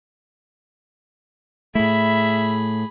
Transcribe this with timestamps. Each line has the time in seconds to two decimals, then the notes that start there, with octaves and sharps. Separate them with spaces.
1.75 A2 A3 G#4 E5 B5